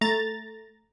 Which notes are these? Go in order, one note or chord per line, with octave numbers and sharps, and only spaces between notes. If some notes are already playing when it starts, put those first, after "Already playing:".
A3 A#5 A6